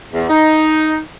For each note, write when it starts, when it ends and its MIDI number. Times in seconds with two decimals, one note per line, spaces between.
0.13 0.27 40
0.29 0.99 63